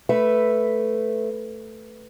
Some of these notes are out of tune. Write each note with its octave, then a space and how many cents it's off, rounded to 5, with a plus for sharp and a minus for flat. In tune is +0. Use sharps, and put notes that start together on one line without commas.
A3 +0 B4 +0 E5 +0